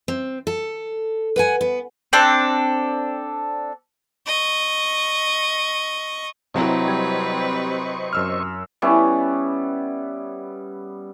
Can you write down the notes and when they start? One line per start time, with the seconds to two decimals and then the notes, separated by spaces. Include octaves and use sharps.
0.08 C4
0.47 A4
1.36 B4 F#5 G#5
1.61 B3
2.13 C4 D4 A4 F#6
4.26 D#5 C#6
6.54 C3 F#3 C4 E4 B4 C5 D#5 C#6
6.88 G3 G#6
8.13 F#2 E6 F6
8.82 G3 B3 C#4 E4